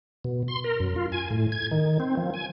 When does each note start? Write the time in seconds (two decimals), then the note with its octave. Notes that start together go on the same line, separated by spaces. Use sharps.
0.25 B2
0.48 C6
0.64 A#4
0.80 F#2
0.96 F4
1.12 G#5
1.30 A2
1.52 G#6
1.71 D#3
2.00 C4
2.17 F3
2.34 G#5